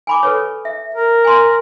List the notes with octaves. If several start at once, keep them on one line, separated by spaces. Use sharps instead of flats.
G#5 B5 D6
A4 B4 C#5
E5
A#4
G#5 C6